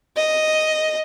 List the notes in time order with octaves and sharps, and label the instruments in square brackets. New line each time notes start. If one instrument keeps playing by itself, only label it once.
[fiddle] D#5